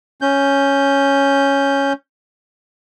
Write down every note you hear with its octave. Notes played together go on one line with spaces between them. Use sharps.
C#4 G6